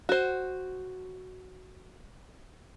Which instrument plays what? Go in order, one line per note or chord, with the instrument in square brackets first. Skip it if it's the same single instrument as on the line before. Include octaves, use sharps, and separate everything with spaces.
[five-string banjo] F#4 C5